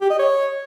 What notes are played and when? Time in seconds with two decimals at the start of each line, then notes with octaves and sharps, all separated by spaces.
0.01 G4
0.10 D#5
0.19 C#5